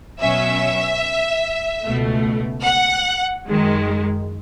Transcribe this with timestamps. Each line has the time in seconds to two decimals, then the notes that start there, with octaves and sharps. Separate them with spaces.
0.21 B2 F#3 C#4 E5
1.83 C#2 B2 A3
2.64 F#5
3.45 F#2 D#3 G#3